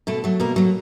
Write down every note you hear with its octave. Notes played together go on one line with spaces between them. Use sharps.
B2 A3 A4
F#3 A3
B2 A#3 A#4
F#3 A3